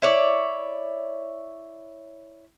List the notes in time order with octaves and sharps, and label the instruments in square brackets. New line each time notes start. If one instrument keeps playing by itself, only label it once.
[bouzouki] E4 C#5 D5